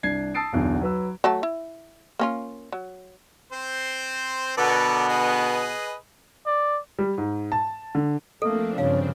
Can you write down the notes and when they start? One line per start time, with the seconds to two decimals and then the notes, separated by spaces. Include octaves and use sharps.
0.03 C2 D4 G#6 C7
0.34 A5 D#6 E6 A6 C7 D7
0.53 B1 E2 D3
0.81 F#3 B4 E6
1.24 F#3 A3 A5
1.43 E4
2.19 A#3 C#4 F4
2.73 F#3
3.52 C4 C5
4.57 B2 D3 B3 A4 A#4 D5
5.09 G#4 B4 D#5
6.47 D5
6.99 G3
7.18 G#2
7.52 A5
7.95 D3
8.42 F3 A3 A#3 C4 D4 A4
8.78 G2 C#3 C#5 F5